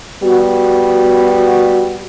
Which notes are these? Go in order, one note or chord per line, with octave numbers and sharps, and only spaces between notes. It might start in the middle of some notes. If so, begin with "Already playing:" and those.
G3 B3 F#4